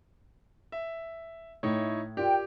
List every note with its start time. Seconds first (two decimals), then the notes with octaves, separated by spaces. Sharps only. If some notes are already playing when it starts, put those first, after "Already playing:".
0.72 E5
1.63 A2 D#4 E4 C#5
2.17 F4 G4 A#4 D5 G5